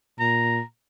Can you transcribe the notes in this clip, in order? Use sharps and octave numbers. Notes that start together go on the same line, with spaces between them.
A#2 A#5